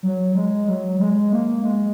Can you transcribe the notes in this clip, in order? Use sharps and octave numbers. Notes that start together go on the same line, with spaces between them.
F#3
G#3
F#3
G#3
A#3
G#3